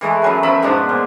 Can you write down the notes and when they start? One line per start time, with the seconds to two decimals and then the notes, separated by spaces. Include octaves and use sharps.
0.01 E3 G#3 A3
0.22 F#2 F#3 B4
0.43 F#2 F3 E5 B5
0.62 G#2 B2 F3 D4
0.89 A#2